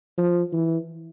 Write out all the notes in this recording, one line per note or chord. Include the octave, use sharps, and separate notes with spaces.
F3
E3